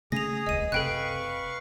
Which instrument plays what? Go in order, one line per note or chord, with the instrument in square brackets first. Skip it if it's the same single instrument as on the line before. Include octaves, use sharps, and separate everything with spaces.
[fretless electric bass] C#3 A3 C#4 [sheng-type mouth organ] G#4 D#6 [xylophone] A#6 F7
[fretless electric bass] D#1 C#2 [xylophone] D#5 D#7
[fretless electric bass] F#1 C3 [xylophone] A4 G5 F#6 [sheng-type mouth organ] B4 F5 C#6